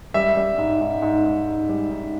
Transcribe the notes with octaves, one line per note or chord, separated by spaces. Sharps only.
G3 E5
G3
G#2
G#2
G#2
G#2
G#2
G3
G#2